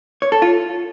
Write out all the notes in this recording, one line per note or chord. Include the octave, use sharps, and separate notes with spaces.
C#5
A4
F4